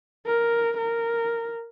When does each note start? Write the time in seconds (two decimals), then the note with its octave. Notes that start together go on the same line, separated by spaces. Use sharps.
0.27 A#4
0.77 A#4